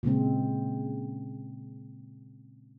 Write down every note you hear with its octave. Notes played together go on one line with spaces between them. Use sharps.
A#2 C#3 G#3 C4